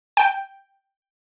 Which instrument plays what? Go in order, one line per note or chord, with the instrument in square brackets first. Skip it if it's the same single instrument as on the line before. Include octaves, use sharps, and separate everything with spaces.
[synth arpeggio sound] G5